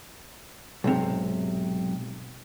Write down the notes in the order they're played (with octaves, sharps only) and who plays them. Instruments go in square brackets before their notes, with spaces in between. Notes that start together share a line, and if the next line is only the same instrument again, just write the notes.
[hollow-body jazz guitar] B1 G#2 C3